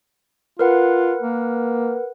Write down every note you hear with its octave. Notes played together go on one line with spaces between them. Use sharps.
F4 A#4 B4 F#5
A#3